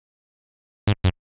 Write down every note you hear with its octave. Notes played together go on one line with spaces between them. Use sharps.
G#2
F#2